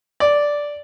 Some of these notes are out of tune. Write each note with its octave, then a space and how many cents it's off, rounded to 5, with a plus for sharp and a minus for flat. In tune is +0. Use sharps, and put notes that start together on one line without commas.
D5 -5